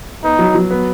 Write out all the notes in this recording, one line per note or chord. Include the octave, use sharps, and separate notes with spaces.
B3 D#4
F#3
F#3
B3